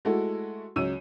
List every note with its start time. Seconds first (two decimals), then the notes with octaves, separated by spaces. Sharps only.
0.05 G#3 A3 E4 F#4 A4
0.76 C#2 F#3 E6 D#7